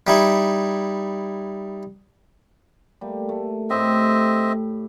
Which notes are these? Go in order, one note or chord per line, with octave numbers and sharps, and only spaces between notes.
G3 D#4 E4
G3 A3 A#3
A3
A2 C4 G4 D#5 E5